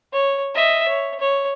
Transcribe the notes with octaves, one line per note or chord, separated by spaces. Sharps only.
C#5
D#5 E5
C#5
C#5